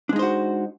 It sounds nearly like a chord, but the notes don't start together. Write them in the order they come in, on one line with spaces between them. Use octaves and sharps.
D4 G#3 D#4 C5 F#4